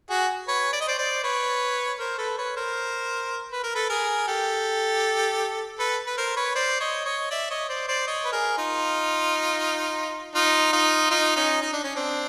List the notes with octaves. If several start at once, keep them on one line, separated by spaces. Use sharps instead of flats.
F#4 G#4
B4 C#5
D5
D#5
C5 D5
C5 D5
B4 C#5
A#4 C5
A4 B4
B4 C#5
A#4 C5
B4
A#4
A4 B4
G#4 A#4
G4 A4
A4 B4
B4
A#4 C5
B4 C#5
C5 D5
C#5 D#5
C#5 D#5
D5 E5
C#5 D#5
C5 D5
C5 D5
C#5 D#5
B4
G#4 A#4
D#4 F4
D#4 F4
D#4 F4
D#4 F4
C#4 D#4
D#4
D4
C#4
C4 D4